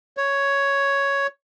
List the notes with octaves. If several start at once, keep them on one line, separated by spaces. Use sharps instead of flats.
C#5